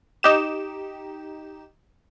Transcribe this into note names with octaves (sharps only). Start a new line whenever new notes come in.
D#4 G4 E7